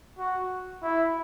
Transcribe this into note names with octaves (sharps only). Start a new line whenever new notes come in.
F#4
E4